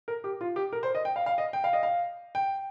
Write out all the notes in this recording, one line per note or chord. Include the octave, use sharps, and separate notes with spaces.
A#4
G4
F4
G4
A#4
C5
D#5
G5
F5
F5
D#5
G5
F5
D#5
F5
G5